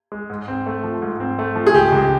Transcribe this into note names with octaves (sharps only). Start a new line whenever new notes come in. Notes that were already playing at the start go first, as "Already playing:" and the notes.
G#3
G#2
C4
A3
F3
G#2
C4
A3
F3
G#4
C#2 G4
C#2